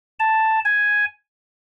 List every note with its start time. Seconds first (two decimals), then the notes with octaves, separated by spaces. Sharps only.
0.20 A5
0.65 G#5